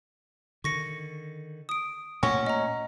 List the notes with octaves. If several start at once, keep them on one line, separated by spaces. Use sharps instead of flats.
D3 D#3 C#6 A#6 C#7
D#6 D7
A#2 A3 C#4 F#5 A#6
D#5 A#5